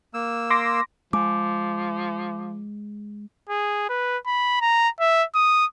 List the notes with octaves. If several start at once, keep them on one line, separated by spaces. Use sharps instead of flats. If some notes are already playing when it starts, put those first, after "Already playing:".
A#3 E6
C6 D6 A#6
F3 G#3 D6
G#4
B4
B5
A#5
E5
D#6